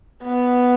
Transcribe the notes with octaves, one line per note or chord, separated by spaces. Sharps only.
B3